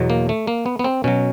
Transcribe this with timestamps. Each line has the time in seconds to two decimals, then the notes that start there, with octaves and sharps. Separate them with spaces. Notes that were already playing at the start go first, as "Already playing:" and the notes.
Already playing: E2 B2 F#3
0.10 A#3
0.29 A3
0.47 A#3
0.66 B3
0.79 B3
0.84 C4
1.04 B2 F#3 C#4